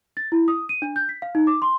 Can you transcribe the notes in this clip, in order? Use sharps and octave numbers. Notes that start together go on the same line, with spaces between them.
A6
E4
D#6
D#7
D4
G6
B6
F5
D#4
D6
C6